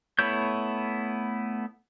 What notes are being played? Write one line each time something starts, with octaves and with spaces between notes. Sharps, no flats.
A3 B3 E4 C#5 G6